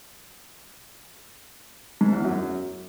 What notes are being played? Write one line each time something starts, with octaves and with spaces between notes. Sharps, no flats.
G#2
E2
F#2